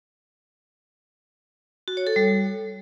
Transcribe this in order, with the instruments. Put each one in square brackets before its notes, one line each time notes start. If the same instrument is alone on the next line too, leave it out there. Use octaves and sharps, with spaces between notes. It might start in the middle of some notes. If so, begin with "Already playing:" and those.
[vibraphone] F#4
C#5
A4
G3